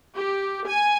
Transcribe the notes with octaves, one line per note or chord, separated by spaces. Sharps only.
G4
G#5